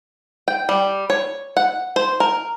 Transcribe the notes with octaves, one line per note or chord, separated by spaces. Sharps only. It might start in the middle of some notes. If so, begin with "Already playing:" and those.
G5
G3
C#5
F#5
C5
A#4